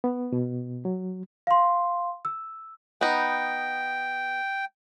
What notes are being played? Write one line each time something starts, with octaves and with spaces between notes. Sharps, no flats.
B3
B2
F#3
F5 C6
E6
B3 D#4 G5